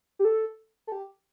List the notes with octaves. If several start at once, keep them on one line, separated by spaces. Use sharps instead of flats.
G4
A4
A4
G4